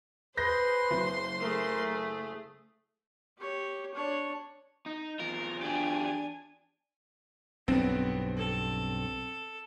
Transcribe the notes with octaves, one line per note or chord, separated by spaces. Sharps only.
G#4 B4 C5 C6 G6 A#6 C7
F#1
A3 G#4 A#4
G4 C#5
D4 C#5
D#4
E2 F4 A#4
D4 G4 G#4 G#5
B1 G2 B3 C4
A4